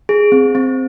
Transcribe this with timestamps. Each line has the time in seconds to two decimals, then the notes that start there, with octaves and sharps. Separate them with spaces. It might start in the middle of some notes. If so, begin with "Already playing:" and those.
0.09 G#4
0.32 C4
0.55 C4